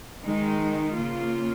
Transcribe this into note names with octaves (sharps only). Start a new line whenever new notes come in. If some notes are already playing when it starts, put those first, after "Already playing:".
D#3 G#3 D#4
C#3 A#3 F4